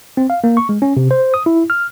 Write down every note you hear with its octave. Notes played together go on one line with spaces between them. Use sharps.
C4
F5
A#3
C#6
G#3
C#4
C3
C5
D#6
E4
F6